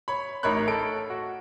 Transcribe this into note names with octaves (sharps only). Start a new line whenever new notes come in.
C#5 B5
A1 D#4 A#4 C#5 B5 F#6
A4 D7
F#4